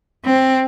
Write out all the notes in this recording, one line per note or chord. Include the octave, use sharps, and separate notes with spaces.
C4